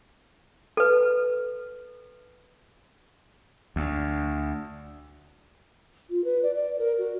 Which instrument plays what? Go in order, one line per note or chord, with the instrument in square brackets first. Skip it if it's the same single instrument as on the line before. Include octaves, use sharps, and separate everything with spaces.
[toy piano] A4 B4
[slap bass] D2
[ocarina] F4
B4
D5
D5
A#4
F#4